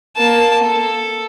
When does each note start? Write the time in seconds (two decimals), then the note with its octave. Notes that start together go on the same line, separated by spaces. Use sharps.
0.17 A#3 A5
0.64 A4